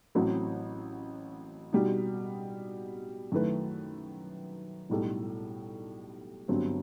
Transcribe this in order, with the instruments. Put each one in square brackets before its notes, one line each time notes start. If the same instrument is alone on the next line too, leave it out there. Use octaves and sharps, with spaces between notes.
[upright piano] A1 A2 F#3 C4 F#4
B2 G3 D#4
F#2 D#3 A3 E4 B4
B1 A2 G3 D#4 A4
G1 G2 F#3 C4